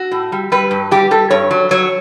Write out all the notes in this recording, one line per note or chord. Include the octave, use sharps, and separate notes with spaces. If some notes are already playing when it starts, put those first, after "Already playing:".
Already playing: F#4
A2
G3
G3 B4
G2
G3 G4
G3 A4
G2 C#5
F#3
F#3 C#5